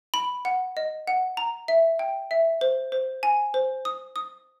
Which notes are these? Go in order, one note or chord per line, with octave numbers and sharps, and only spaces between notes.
B5
F#5
D#5
F#5
A#5
E5
G5
E5
C5
C5
G#5
C5
D#6
D#6